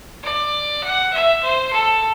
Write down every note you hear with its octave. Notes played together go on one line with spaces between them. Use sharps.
D5
F#5
E5
C5
A4